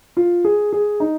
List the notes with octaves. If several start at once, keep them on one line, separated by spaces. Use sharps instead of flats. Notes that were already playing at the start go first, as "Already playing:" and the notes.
F4
G#4
G#4
D#4